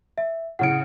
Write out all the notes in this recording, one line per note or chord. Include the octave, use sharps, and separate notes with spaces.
E5
A2 C#3 F#5 C#7 D7